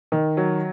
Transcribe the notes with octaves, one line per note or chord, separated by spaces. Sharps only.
D#3
F#3